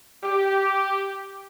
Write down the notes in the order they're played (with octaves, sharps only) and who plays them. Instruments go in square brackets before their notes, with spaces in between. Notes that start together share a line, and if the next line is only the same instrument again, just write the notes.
[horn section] G4